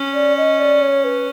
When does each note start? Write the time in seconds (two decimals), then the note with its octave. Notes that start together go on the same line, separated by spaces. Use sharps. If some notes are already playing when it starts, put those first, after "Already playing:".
Already playing: C#4
0.14 D5
0.37 D#5
0.60 D5
0.82 C#5
1.04 B4